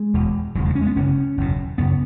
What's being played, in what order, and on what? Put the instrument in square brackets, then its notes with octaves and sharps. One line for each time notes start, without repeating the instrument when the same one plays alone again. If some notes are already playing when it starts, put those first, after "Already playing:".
Already playing: [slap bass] G#3
E1 E2 B2
E1 E2 C#3 F#3
G#3
C#4
G#3
B3
F#1 F#2 C#3 C#4
F#1 E2 B2
F#1 F#2 C#3 B3